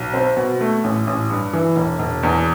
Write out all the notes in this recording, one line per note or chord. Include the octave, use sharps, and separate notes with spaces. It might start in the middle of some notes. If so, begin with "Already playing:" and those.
Already playing: B1
C4
B2
A3
A1
A1
G2
E3
E1
E1
E2